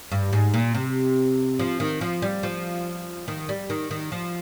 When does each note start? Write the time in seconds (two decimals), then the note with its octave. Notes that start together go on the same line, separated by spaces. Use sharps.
0.12 G2
0.33 G#2
0.54 A#2
0.75 C3
1.59 F3
1.80 D#3
2.01 F3
2.22 G3
2.43 F3
3.28 D#3
3.49 G3
3.70 D#3
3.91 D#3
4.12 F3